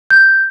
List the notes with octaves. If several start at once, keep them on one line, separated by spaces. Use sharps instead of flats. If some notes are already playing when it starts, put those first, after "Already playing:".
G6